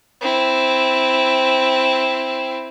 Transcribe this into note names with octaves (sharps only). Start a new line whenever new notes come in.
C4 E4